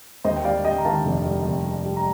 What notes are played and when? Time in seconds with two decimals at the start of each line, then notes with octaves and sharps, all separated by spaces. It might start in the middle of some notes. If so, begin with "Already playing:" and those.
0.24 D#2 C5 D#5
0.36 G5
0.44 G3 D5 F5
0.65 G3 D#5 G5
0.78 A#5
0.85 D#3 F5 A5
1.05 F1
1.25 G3
1.46 F1
1.66 G3
1.85 G3
1.97 A#5